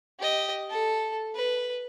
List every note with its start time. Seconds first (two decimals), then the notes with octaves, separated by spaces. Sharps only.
0.20 G4 D#5
0.70 A4
1.35 B4